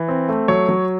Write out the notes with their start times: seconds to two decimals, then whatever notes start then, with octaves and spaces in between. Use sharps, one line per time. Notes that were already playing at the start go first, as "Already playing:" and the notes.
Already playing: E3
0.08 C4
0.29 A3
0.48 F#3 C#5
0.68 F#3